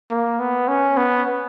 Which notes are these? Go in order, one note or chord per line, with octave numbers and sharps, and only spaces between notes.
A#3
B3
C#4
B3